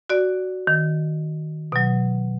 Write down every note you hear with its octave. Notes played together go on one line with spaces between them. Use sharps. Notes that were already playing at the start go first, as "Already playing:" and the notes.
F#4 D5
D#3
B2 F#3